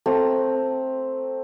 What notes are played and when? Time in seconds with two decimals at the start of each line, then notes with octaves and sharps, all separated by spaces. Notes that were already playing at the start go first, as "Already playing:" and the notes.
0.06 A3 C4 A#5